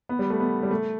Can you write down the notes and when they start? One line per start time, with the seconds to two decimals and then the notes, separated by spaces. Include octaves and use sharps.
0.09 B3
0.19 G3
0.30 A3
0.40 B3
0.63 G3
0.71 A3